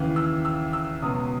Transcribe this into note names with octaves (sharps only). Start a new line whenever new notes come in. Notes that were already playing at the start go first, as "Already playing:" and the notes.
Already playing: D#2 C#3 E3
E6
E6
E6
C#2 B2 F#3 B3 D#6